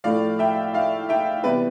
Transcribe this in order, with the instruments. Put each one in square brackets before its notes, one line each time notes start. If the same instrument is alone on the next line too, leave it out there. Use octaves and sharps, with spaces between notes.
[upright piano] A2 F3 A3 D5 F5
E5 G5
D5 F5
E5 G5
E2 C3 G3 B3 B4 D5